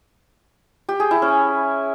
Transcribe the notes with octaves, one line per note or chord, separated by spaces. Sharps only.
G4
G#4
E4
C#4